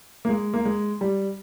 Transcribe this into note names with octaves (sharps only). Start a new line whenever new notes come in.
A#3
G#3
A#3
G#3
G3